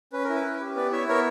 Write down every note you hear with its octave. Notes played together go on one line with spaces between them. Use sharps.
C#4 B4
A#4
E4
B4
C#4
G4
B3 B4 D5
E4 C#5 E5
B3 A#4 C#5